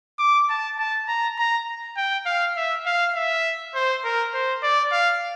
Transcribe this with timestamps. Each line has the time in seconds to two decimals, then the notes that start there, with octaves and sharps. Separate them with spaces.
0.19 D6
0.50 A5
0.79 A5
1.08 A#5
1.38 A#5
1.97 G5
2.26 F5
2.57 E5
2.86 F5
3.16 E5
3.75 C5
4.04 A#4
4.34 C5
4.63 D5
4.92 F5